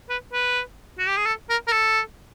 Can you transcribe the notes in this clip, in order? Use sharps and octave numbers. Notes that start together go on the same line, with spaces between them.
B4
B4
F#4
G4
G#4
A4
A#4
A#4
A4